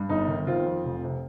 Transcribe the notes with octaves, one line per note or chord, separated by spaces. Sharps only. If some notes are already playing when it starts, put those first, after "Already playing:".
Already playing: G2
G1 D#4
D#3
D#3 C4 F4
F2
F1
C3